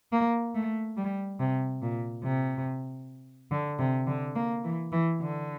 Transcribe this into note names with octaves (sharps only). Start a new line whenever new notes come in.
A#3
A3
G3
C3
A#2
C3
D3
C3
D3
A#3
E3
E3
D3